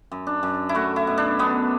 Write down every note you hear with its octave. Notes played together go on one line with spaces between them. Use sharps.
F#2
D4
F#2
E4
A3 F#4
E4
B2
D4
F#2 B3